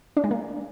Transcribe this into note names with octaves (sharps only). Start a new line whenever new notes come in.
D4
G#3
A#3